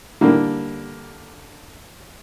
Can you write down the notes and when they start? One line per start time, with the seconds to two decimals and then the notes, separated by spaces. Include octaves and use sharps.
0.21 D3 G3 A#3